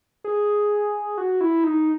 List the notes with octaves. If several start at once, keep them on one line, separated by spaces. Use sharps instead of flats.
G#4
F#4
E4
D#4